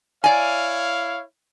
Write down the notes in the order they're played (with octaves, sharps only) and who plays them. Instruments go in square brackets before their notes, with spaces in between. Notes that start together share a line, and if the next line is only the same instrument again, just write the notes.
[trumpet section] E4 C#5 F5 [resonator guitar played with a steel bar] D5 G#5